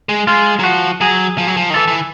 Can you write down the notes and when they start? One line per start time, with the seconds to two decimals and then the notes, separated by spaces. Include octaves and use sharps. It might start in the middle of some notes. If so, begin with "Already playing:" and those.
0.09 G#3
0.27 G#3 F4
0.59 F#3
0.64 F3 F#4
1.01 F#3 G#4
1.38 F3
1.47 F#3
1.57 F3
1.70 D#3
1.74 E3 A4
1.88 E3